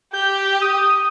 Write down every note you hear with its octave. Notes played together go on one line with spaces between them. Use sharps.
G4 G6
D#6